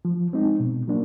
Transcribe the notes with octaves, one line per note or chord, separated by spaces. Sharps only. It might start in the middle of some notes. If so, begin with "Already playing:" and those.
F3
G#3 C4 D#4
B2
F#3 A#3 D4